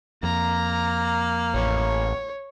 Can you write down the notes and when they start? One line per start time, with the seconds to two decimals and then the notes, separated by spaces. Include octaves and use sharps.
0.23 F2 A#3 A#5
1.55 A1 C#5